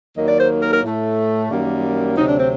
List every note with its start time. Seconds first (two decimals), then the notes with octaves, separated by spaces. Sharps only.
0.16 D#2 D#3 F#3 A#3 D#5
0.28 D5
0.39 C5
0.61 A#4
0.72 A#4
0.83 A2 A3
1.50 F#2 D#3 G3 A#3
2.17 D2 C3 F#3 D#4
2.28 D4
2.39 C4